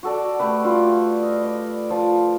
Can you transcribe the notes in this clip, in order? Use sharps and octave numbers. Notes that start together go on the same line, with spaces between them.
F#4 A4 D5
A3 G4 B4
G3 E4 F4 G4
D#5
D5
F3